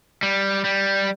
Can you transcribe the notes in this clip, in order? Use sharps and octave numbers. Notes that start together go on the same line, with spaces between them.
G3
G3